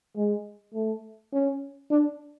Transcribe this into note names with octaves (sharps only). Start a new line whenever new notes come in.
G#3
A3
C#4
D4